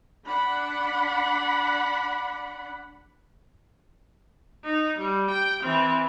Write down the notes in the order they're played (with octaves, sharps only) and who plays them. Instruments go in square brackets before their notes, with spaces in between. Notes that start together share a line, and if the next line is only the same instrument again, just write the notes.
[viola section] D4 F#5 B5
[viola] D#4
G3
G5
E3 C4